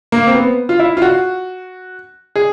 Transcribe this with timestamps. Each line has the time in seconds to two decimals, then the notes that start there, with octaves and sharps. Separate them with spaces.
0.12 A#3
0.27 C4
0.35 B3
0.69 F4
0.80 E4
0.97 F4
1.02 F#4
2.36 G#4